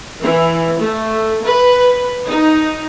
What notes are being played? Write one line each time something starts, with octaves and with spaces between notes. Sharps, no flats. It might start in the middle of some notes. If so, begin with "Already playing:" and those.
E3
A3
B4
D#4